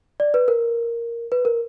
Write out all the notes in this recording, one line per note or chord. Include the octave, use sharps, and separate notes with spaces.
D5
B4
A#4
B4
A#4